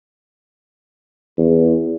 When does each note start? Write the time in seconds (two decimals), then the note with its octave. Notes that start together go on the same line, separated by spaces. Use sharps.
1.38 E2